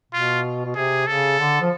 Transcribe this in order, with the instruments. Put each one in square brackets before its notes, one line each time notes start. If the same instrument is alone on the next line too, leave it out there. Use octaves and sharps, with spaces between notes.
[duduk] B2 [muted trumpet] F4
[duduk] B2
[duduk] C3 [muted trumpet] G#4
[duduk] C#3 [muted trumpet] A4
[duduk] D3
F3